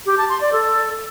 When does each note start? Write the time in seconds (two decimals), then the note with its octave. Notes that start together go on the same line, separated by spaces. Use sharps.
0.06 G4
0.18 A5
0.29 C6
0.41 D5
0.53 A4